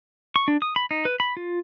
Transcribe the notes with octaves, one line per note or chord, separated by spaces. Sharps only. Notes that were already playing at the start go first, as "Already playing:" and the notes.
C#6
D4
D#6
B5
D#4
B4
B5
F4